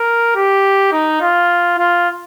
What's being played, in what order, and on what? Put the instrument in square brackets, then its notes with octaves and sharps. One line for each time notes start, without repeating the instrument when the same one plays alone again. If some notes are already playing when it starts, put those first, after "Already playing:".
Already playing: [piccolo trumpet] A#4
G4
D#4
F4
F4